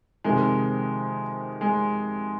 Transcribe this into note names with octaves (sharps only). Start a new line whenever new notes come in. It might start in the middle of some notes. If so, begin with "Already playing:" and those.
F2 C3 D#3 G#3
G#3